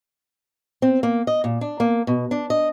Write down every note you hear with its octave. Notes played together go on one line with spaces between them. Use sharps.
C4
A#3
D#5
A#2
D4
A#3
B2
D4
D#5